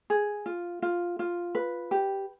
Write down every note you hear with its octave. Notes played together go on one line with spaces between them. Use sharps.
G#4
F4
F4
F4
B4
G4